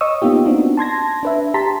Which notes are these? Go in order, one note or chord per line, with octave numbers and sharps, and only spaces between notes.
C#5 D#5 C#6 D#6 E6
A#3 B3 D#4 F4 G4
B3 C4 D4 D#4 F#4
A5 C6 G#6 A#6
D4 B4 E5
G4 A5 A#5 C6 B6